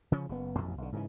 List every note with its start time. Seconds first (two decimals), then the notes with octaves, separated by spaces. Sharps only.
0.12 C#3 F3 C#4
0.29 F#1 B2 B3
0.57 A1 F2 B2
0.78 B1 D3
0.92 G#2 C#3 E3